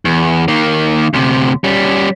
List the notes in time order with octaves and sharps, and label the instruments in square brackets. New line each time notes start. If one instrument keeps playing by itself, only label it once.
[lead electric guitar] E2
D#3 A#3
D2 C3
G3 C#4